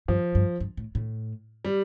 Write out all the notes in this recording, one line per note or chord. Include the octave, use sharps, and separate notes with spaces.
G2 F3
G2
G2
A2
A2
G3